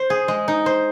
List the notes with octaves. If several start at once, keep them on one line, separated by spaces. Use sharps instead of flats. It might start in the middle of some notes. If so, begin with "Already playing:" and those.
Already playing: C5
G#4
G#3
D#4
C5